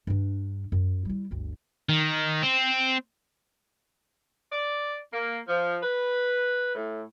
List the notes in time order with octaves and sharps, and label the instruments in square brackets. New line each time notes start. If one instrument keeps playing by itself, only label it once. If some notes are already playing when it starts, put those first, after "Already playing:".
[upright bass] G2 D4
F#2
G3 E4
G1 D2
[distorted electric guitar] D#3
C4
[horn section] D5
A#3
F3
B4
A2